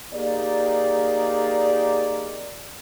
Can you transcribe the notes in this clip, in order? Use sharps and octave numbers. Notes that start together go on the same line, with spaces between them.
A#3 D#4 G4 G#4 D5